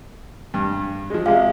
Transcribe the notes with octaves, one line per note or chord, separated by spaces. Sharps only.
G2
F3 G#3
C3 G#3 G4 F5